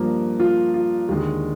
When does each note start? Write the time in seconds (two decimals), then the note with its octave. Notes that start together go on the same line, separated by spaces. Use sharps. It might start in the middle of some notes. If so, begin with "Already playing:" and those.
Already playing: G2 F3 A#3
0.40 F4
0.74 F4
1.08 D#2 D3 G#3